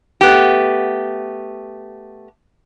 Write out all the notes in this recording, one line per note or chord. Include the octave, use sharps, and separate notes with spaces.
A3 B3 G4